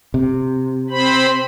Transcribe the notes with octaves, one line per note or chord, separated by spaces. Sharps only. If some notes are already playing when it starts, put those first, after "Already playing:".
C3
C4 C5 B5